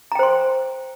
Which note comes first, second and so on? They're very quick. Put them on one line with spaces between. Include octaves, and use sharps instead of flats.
A#5 G5 C5 C6